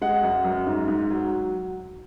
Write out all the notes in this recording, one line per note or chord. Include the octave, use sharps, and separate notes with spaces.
G#3 F#5
F#2
F#2
G#2
G#2
F#3